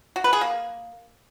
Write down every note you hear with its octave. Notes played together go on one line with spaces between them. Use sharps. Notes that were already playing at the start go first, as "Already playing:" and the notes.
F#4
B4
G#4
A#3